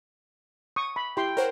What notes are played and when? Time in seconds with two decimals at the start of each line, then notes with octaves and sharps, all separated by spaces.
0.76 C#6 D#6
0.96 B5
1.17 E4 G4 G5 C6
1.37 A#4 C5 C#5 F#5